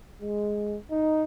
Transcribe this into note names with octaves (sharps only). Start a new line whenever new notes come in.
G#3
D#4